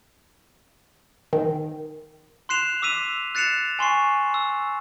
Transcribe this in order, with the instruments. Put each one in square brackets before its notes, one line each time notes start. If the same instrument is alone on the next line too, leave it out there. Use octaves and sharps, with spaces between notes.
[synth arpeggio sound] D#3
[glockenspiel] C6 F#6 C7 E7 F7
D6 E6 B6 D#7 F7
F#6 A6 C7 C#7 E7 F7
G#5 C6 C#6 C7
E6